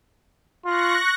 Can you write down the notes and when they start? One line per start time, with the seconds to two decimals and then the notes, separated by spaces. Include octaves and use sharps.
0.66 F4 C#6 F#6 A#6